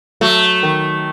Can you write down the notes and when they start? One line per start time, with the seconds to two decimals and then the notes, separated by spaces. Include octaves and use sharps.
0.21 F#3 A3
0.63 D#3